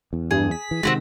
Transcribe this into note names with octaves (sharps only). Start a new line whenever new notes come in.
E2
G2 G#4
B6
E3
C3 D#3 G#3 C4 F4 F#4